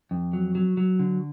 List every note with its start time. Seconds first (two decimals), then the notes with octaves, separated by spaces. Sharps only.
0.11 F2
0.33 F#3
0.55 F#3
0.77 F#3
0.99 D3